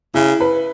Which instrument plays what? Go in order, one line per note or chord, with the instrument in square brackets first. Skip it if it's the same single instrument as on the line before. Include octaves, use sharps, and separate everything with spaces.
[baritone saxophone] C#3 [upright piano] E4
[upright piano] B4